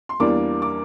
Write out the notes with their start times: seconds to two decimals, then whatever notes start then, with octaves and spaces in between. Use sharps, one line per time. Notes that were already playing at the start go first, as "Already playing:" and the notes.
0.09 C6
0.20 E2 E3 G3 A#3 D4 D6
0.62 D6